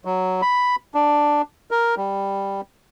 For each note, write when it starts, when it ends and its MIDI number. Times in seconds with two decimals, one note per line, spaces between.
0.05 0.41 54
0.42 0.76 83
0.95 1.42 62
1.71 1.95 70
1.97 2.61 55